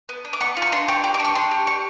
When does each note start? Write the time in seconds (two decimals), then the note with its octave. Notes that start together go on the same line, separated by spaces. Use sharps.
0.09 B3
0.25 D4
0.33 D6
0.40 B3 C#6
0.57 F4
0.62 C#6
0.72 D4 C6
0.88 G4 C#6
1.04 G4 D6
1.14 D6
1.20 D4
1.25 C#6
1.35 D4 C6
1.51 G4
1.67 G4 C#6